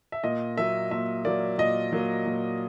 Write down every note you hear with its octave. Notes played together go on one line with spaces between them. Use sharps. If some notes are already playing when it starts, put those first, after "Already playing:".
E5
A#2 D#5
F#3 A#3 E5
A#2 E5
F#3 A#3 D5
A#2 D#5
F#3 A#3
A#2